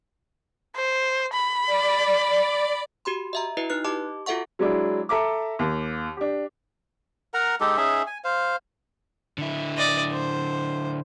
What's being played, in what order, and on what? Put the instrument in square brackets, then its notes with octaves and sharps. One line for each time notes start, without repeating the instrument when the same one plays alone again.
[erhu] C5
B5
[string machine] D5
[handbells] F#4 G4 B5 C6
D#5 E5 A#5
E4 F#4 B4 D#5
D#4 B4 F#6
G4 D#5 A5 D6
F4 F#4 A4 E5 F#5 C#6
[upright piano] F#3 G#3 D4 E4
A4 E5 A#5 D6
D#2
D4 G4
[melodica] A#4 F#5 A#5
G#3 D#4 G4 A4
C#4 D#4 G#4 E5
G#5
C5 F5
[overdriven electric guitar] D3 E4
[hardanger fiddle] D5 D#5
C5